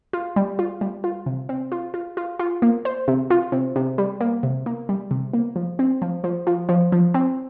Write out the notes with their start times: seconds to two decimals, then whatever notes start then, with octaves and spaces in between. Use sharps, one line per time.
0.13 F4
0.36 G3
0.59 F4
0.81 G3
1.04 F4
1.26 C3
1.49 C4
1.72 F4
1.94 F4
2.17 F4
2.39 F4
2.62 A#3
2.85 C5
3.08 C3
3.30 F4
3.52 C3
3.76 C3
3.98 G3
4.21 A#3
4.43 C3
4.66 A#3
4.89 G3
5.11 C3
5.33 A#3
5.56 F3
5.79 C4
6.02 F3
6.24 F3
6.47 F3
6.69 F3
6.92 F3
7.14 C4